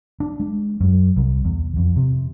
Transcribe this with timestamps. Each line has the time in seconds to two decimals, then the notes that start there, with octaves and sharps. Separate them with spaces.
0.20 D4
0.40 G#3
0.81 F#2
1.16 C2
1.45 E2
1.76 F2
1.96 C3